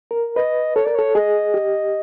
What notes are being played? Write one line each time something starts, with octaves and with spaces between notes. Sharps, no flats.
A#4
B4 D#5
A4 C#5
A#4 D5
A4 C#5
G#4 D#5
G4